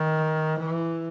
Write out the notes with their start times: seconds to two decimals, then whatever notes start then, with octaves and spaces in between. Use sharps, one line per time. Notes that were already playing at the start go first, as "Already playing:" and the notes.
Already playing: D#3
0.59 E3